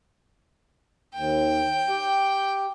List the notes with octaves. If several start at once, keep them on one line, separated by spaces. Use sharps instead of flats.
D#2 G5
G4